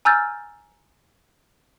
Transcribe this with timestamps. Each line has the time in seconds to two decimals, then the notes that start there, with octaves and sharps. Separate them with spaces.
0.05 G#5 A#5 E6 F6 G6 A6